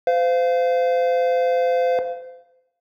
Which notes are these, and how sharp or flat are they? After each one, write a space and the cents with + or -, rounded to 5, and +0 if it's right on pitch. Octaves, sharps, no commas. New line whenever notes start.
C5 -35 F5 -10